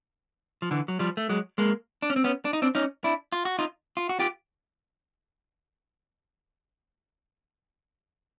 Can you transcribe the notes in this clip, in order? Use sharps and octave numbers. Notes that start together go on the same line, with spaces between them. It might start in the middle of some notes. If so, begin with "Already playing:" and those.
F3
D3 E3
F#3
F3 G3
A3
F#3 G#3
G#3 A#3
D4
C#4
C4
B3 C#4
D4
D#4
C4 D4
C#4 D#4
D4 E4
F4
F#4
D#4 F4
F4
F#4
F4 G4